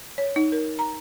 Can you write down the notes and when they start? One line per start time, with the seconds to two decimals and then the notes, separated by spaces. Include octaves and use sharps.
0.18 C#5
0.36 D#4
0.52 A#4
0.79 A#5